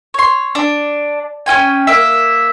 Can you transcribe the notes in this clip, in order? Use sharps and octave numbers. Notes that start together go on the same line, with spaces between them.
C#5 C6
D4
C#4 F4 G5 G#5
A#3 E5